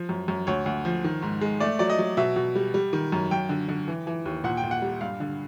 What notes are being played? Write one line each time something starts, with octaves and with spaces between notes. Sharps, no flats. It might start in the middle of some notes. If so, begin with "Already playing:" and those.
Already playing: F3
F#2
F#2
D2 C#5
D2
F3
D#3
G#2
G#3
A3 D5
F#3 D5
D#5
F#3
B2 E5
B2
G3
G3
D#3
F#2
F#2 G5
D3
D3
E3
E3
D#2
A#2 F#5
G5
A#2
F#5
G3
G2 F5
D3